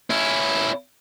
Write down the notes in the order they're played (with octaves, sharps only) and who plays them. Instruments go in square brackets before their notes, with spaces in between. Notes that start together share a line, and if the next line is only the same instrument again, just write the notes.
[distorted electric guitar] C#4 E4